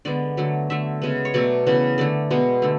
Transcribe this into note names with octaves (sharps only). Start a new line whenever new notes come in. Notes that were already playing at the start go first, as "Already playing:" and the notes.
D3 G#3 B3 D5
D3 F#3 A3
D3 A3 E5
C#3 G#3 B3
C#5
B2 F#3 A3 D5
C#3 E3 B3
D3 A3 D5
B2 G#3 B3
D3 A3